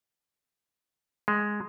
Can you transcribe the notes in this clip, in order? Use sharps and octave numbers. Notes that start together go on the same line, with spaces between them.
G#3